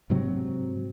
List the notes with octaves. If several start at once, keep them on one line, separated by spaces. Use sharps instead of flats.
G#2 C3 F#3 C4